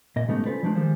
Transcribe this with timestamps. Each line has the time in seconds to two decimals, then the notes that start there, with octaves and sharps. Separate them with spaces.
0.16 A#2 D#5
0.28 G#2 C#3 G3 A3 B3 D#4
0.46 C#4 F4 A4 B4 C5 D5
0.63 F3 G#3 A3 C#4 D4 F4
0.75 D#3 F3 G3 G#3 C5